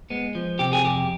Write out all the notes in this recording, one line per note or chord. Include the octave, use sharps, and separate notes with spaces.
G#3 B3
F3
C3 G4
G#4
F2 G4